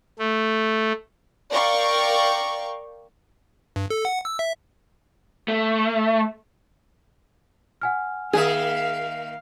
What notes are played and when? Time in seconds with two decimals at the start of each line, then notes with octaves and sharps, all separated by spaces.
0.19 A3
1.51 A#4 D5 F5 G5 C#6
3.76 G2
3.90 A4
4.05 F#5
4.25 E6
4.39 E5
5.48 A3
7.81 F#5 G#5 F6
8.33 D#3 A#3 G#4 E5 F5